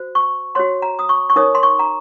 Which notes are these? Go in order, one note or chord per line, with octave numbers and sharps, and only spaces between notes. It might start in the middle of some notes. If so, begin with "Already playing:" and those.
Already playing: F#4 C5
C#6
F#4 C#5 C6
A#5
D#6
C#6
C#6
D#4 A#4 C#5 D#6
C6
C#6
A#5